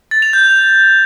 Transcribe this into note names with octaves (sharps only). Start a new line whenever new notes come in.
A6
F7
G6